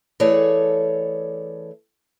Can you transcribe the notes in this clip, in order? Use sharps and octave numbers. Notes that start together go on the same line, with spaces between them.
E3 A3 G#4 A4 C#5 D5